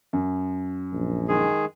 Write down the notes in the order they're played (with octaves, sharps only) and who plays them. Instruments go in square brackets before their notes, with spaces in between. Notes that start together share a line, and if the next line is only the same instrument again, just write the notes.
[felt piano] F#2
[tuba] A#1
[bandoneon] D#3 G#3 G#4